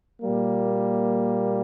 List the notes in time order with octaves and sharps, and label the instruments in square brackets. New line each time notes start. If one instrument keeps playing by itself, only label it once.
[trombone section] A#2 G3 A#3